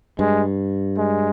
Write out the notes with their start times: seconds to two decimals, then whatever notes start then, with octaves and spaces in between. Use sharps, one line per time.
0.19 G2 G#3
0.98 G#3